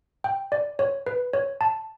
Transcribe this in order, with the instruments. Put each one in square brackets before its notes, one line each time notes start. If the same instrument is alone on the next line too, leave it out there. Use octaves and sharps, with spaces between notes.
[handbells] G5
D5
C#5
B4
C#5
A5